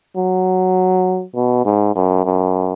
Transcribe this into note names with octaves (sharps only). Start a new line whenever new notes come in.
F#3
B2
G#2
F#2
F#2